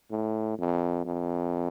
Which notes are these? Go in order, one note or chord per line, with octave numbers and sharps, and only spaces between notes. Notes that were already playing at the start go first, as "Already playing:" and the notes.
A2
F2
F2